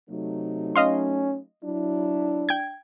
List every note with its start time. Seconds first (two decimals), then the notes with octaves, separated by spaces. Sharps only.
0.10 C3 F#3 A3 D#4
0.76 C#4 D#5 F5 C6
1.64 F#3 D4 E4
2.49 G5 G#6